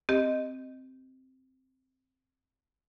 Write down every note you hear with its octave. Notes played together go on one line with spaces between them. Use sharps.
C4 G4 D#5